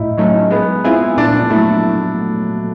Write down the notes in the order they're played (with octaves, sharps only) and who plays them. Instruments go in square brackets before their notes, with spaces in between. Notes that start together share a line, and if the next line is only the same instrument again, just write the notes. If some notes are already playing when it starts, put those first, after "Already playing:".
Already playing: [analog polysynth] A2 [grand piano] D#4 E4
[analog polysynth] F#3 A3 C#4 [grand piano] D#4
[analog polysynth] G#3 [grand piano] B3
[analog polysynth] C4 F4 G#4 [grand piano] E4
[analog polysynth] A#2 [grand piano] D4
[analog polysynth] F#3 A3 [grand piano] E4